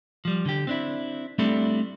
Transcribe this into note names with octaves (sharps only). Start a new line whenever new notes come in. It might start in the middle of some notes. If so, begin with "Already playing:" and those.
F3 G3
D3 G4
C4 D4 E4
G3 A3 C4 D4 E4 A4